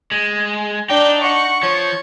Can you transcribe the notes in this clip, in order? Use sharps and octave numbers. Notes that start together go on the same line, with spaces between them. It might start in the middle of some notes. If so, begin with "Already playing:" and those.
G#3
D4 D#4 D5 G5
F#5 C#6
F3 C#5